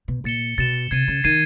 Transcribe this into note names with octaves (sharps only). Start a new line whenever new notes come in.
B2
A#2 A6 C#7 E7 G7
B2 A6 C#7 E7 G7
C3 G#6 C7 D#7
C#3
D#3 G#6 C7 D#7